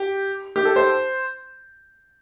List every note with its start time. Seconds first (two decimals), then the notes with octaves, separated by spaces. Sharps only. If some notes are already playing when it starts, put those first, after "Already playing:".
Already playing: G4
0.56 G4
0.65 A4
0.76 C5